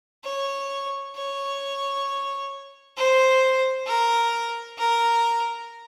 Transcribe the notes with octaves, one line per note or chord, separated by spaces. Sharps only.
C#5
C#5
C5
A#4
A#4